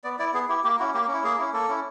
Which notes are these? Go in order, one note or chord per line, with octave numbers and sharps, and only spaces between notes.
B3 D5
E4 D5
B3 G#4
E4 G4
A#3 G4
C#4 E4 F#4
A#3 G4
C#4
E4
A#3 G#4
C#4 E4
A#3 A4
C#4 E4